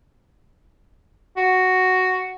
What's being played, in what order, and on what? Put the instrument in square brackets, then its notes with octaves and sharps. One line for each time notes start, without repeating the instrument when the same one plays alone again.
[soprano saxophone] F#4